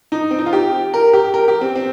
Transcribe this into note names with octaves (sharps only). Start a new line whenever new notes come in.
D#4
C4
D#4
F4
G4
A#4
G4
A#4
G4
C4
C4